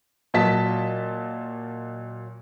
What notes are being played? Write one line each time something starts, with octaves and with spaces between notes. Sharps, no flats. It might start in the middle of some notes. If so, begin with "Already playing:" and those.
A#2 F#3 D#5 A5 B6